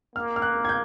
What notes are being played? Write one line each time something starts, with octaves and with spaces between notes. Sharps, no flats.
A#3 F6
F6
F#6
G#6
G6